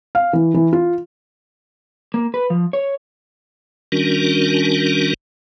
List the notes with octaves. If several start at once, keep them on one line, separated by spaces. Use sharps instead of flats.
F5
E3
E3
F4
A#3
B4
F3
C#5
D#3 G3 C#4 D4 F#4 A#4